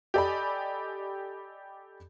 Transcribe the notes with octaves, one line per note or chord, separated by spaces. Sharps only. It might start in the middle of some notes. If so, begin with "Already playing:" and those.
G4 A4 D5 D#5 G#5 B5